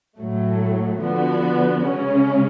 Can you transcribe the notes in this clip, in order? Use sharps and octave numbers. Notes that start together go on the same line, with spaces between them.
A2 F#3 A3
D3 F3 B3 F#4
C#3 G#3 C#4